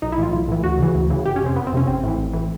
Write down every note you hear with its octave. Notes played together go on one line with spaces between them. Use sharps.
B1 D#4
E4
A2 E3 F4
B1
A2 E3
D2 F#4
C#3 E3
D2
C#3 E3
G1 G4
C#4
F2 C3 C4
G1 B3
C4
F2 C3 C#4
A1 C4
A2 E3
A1
A2 E3